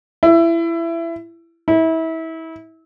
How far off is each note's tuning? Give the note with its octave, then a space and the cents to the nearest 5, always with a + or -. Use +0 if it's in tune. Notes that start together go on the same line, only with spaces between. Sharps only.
E4 +20
E4 -30